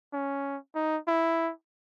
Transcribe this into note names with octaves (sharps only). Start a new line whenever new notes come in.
C#4
D#4
E4